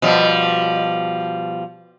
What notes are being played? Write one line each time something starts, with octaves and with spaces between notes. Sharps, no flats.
B2 F3 G3